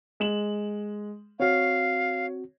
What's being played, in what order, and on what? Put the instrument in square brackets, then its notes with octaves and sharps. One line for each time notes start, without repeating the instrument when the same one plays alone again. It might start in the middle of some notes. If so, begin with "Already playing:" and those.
[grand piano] G#3 E7 F#7
[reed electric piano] C4 F#4 [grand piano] C#5 [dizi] F5